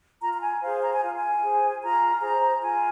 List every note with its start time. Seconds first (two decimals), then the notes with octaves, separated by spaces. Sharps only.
0.22 F4 A#5
0.33 A#5
0.42 G#5
0.62 G#4 C5 F5
0.82 A#5
0.92 G#5
1.02 F4 F5
1.14 G#5
1.41 G#4 C5
1.82 F4 A#5
2.21 G#4 C5 A#5
2.60 F4 G#5